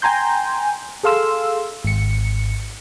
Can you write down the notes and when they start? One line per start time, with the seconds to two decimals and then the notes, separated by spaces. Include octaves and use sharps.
0.02 G5 G#5 A#5 C6 G6
1.04 G#4 A4 F5 C6 E6
1.85 G#1 C#7